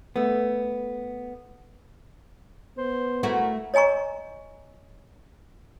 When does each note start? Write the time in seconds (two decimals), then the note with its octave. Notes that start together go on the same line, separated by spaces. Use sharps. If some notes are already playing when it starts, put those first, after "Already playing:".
0.16 A3 B3
2.78 B3 C5
3.23 A3 E4 F#4 A#4
3.74 C#5 D#5 G#5 A#5 C#6